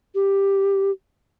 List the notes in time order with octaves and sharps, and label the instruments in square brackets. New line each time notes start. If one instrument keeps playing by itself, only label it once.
[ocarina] G4